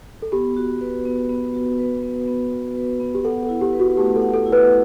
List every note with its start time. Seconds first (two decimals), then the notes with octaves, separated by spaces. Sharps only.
0.22 A4
0.32 B3 G4
0.57 F#4
0.81 B4
1.05 B3
1.29 B3
1.54 F#4
1.79 B4
2.03 B3
2.28 B3
2.51 F#4
2.75 B4
3.00 B3
3.15 G4
3.24 A4 F#5
3.43 A4
3.49 E4
3.61 G4
3.73 B4
3.80 F#4
3.97 A3 G4
4.16 A4
4.22 F#5
4.34 A4
4.46 E4
4.52 B4